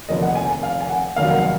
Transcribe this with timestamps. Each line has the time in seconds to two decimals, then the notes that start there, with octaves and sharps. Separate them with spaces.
0.09 F1 D#2 D3 F3 D#5
0.22 F#5
0.35 G#5
0.49 G#5
0.63 F5
0.81 G#5
0.89 F#5
1.16 F1 D#2 D#3 F#3 F5
1.29 F#5
1.42 F5